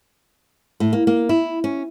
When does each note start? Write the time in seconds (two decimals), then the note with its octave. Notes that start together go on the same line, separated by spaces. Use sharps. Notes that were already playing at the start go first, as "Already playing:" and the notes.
0.80 A2
0.93 A#3
1.07 A#3
1.29 E4
1.64 C#4